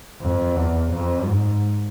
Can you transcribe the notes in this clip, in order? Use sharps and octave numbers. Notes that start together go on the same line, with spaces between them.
F2
E2
F2
G#2